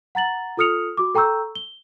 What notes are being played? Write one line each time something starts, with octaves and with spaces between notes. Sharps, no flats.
F#5 A#5 A6 F#7
F4 A4 D#6 F6 C#7 F7
F#4 D6
A4 G5 A#5 C#6 E6 G6
G7